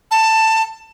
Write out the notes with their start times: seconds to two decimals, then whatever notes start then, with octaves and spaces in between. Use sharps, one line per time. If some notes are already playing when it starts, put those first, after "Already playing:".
0.11 A5